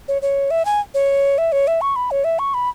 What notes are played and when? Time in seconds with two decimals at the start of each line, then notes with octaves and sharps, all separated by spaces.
0.08 C#5
0.22 C#5
0.51 E5
0.65 G#5
0.94 C#5
1.38 E5
1.52 C#5
1.67 E5
1.81 C#6
1.96 B5
2.11 C#5
2.24 E5
2.39 C#6
2.54 B5